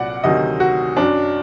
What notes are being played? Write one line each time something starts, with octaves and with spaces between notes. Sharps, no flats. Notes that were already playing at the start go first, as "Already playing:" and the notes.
Already playing: C2 A#2 F#3 D5 F#5
D2 C3 D#3 F#3 D#5
F#4
F#2 F#3 D4